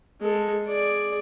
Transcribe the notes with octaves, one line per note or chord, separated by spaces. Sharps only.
G#3 A4
G#4 D5